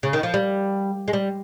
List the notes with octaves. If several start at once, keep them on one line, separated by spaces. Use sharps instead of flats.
C#3
D#3
F3
G3
G#3
G3